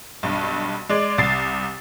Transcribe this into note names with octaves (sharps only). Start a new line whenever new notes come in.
B1 G2
G#3 D5
C2 A6 C7